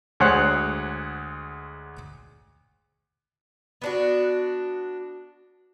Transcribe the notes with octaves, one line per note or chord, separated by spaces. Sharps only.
D2 G#3 C5 C#5 F#5 F#6
B3 D4 F#4